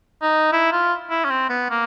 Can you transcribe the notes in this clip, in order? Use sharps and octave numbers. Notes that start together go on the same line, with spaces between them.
D#4
E4
F4
E4
C#4
C4
B3
A#3